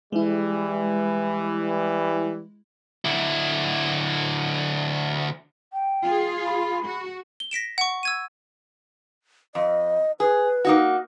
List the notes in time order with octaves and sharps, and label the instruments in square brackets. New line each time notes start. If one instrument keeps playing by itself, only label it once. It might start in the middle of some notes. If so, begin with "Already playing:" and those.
[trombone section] E3 G3 [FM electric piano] G#3 E4
[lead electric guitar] D3 E4
[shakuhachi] G5
[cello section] F4 G#4
[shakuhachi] B5
[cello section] F#4
[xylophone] G7
A#6 B6 D7 E7
F#5 C#6
E6 G#6 D#7
[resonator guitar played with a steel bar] F2 [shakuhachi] D#5
[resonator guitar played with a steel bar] G#4 [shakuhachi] B4
[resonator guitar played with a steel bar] A#3 D#4 F#4